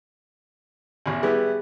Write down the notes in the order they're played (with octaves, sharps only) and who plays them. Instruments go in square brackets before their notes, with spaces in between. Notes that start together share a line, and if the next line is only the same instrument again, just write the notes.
[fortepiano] A1 E2
[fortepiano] G3 B3 E4 [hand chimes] G#4